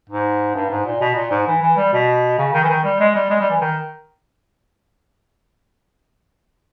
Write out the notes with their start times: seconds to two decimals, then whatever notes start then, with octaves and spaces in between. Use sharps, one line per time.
0.09 G#2
0.55 G2
0.70 G#2
0.85 A#2
1.01 B2
1.15 A#2
1.30 G#2
1.47 E3
1.61 E3
1.76 G3
1.93 B2
2.38 C#3
2.53 D#3
2.64 E3
2.69 D#3
2.84 G3
3.00 G#3
3.15 G3
3.30 G#3
3.40 G3
3.50 E3
3.61 D#3